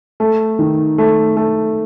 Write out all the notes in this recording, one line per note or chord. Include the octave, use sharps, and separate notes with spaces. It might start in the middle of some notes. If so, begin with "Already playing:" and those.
A3
D#3
A3
A3